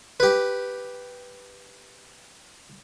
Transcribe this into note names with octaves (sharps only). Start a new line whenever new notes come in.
G4 B4